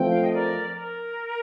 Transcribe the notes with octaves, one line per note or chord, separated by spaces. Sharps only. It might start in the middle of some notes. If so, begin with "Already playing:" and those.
Already playing: F3 A3 C4 F4 G5
F5
D#5
A#4 D5
A#4